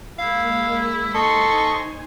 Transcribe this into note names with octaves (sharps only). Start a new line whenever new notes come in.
G#3 A#3 E4 F5
D#4 A4 C5 D#5 G#5 C6 C#6